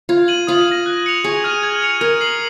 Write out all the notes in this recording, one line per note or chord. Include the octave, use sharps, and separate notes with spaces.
F4 G#6
D#7 F#7
F4 D#6
A#6 D#7
F#6
C#7 F7
G#4 C#6
F6 G#6 D#7 F#7
G#6
C#7 F7
A#4 G#6
C7 F#7